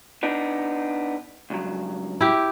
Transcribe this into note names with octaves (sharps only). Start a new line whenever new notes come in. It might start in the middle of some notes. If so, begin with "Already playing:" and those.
B3 D4 D#4
C#2 G2 F#3
E4 G4